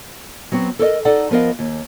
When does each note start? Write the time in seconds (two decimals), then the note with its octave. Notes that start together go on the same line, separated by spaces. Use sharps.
0.52 F#3 B3 C4 F#4
0.79 A4 A#4 C#5 D#5
1.05 D#4 A4 D5 F#5
1.31 F3 B3 A#4 D#5 F5
1.59 D#2